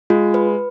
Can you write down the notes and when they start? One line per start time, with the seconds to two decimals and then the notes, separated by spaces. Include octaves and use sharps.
0.10 G#3 F4
0.34 B4